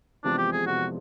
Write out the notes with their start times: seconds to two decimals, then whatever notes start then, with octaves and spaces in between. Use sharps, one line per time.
0.24 F1 E2 C3 F3 G#3 D4
0.38 G4
0.52 G#4
0.66 F1 E2 C3 F3 G#3 F#4